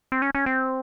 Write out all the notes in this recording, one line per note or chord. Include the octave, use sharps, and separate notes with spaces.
C4
C#4
C#4
C4